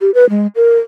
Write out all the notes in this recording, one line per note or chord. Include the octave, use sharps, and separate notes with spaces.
G4
B4
G#3
A#4